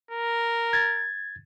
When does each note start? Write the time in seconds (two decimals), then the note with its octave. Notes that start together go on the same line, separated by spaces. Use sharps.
0.11 A#4
0.73 G#6 A6